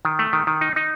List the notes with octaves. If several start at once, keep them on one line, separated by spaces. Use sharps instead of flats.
D#3
A3
D#3
D#3
D#4
D#4